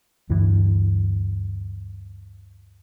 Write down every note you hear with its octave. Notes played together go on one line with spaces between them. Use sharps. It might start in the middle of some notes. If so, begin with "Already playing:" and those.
D2 G2 E3